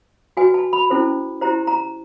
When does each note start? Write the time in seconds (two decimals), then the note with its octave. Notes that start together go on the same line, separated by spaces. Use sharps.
0.37 F#4 B4 G#5
0.54 A5
0.73 B5
0.90 C#4 E4 A4 C5
1.41 E4 G4 C5 A#5
1.67 A#5